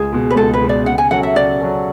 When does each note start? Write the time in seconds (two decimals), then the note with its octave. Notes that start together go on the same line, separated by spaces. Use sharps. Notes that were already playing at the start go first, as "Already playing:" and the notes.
Already playing: C#2 G#4
0.13 B2 G#3
0.30 B4
0.36 C#2 A4
0.54 B4
0.62 B2 G#3
0.69 D5
0.86 C#3 F#5
0.98 G#5
1.11 F#3 C#4 F#4 A4 F#5
1.23 E5
1.36 C#3 D5
1.61 F#3 C#4 F#4 A4